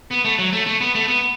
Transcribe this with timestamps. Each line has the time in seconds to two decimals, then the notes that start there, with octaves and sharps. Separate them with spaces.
0.11 B3
0.25 A3
0.39 F#3
0.53 A3
0.67 A3
0.81 B3
0.95 A3
1.08 B3